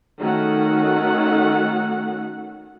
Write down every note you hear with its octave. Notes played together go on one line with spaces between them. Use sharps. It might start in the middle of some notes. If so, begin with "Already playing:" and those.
D#3 A3 C#4 F#4 F#5